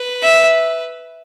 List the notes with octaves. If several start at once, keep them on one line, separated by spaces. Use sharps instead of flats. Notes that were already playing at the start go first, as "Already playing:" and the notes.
Already playing: B4
E5